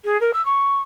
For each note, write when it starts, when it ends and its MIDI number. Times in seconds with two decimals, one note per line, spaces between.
0.04 0.19 68
0.20 0.31 70
0.33 0.44 88
0.45 0.81 85